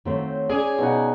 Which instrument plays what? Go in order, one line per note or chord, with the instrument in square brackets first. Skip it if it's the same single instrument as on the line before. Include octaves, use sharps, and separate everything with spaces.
[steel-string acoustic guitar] D#3 A3 C4 [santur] F#3 C5
[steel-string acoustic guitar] C#4 D5 [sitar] G#4
[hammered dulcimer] B2 D#4 F#5 [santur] F#4 C5